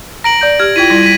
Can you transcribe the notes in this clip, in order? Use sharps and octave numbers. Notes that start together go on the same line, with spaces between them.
A#5 A#6 D7 F#7
D5 G6
G4 F6 G#6
E4 F4 G5 G#6 B6 D#7
G3 E4 D5
B6 D#7